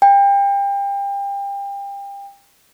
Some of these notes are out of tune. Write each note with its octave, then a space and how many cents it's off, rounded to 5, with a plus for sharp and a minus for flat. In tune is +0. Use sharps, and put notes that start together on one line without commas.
G5 +30